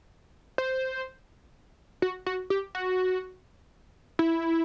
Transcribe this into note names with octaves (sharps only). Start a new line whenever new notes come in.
C5
F#4
F#4
G4
F#4
E4